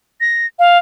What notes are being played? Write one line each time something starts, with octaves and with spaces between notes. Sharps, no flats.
A#6
F5